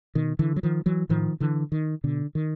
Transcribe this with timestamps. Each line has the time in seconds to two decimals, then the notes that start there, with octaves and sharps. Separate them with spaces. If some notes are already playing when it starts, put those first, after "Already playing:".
0.15 B2 D#3
0.39 D3 E3
0.56 F#3
0.63 D#3 F3
0.86 E3 F#3
1.09 A2 D#3 F3
1.40 D3 E3
1.72 D#3
2.04 B2 D3
2.35 D#3